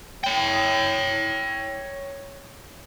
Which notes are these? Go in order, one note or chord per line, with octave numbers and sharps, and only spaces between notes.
C#5 G5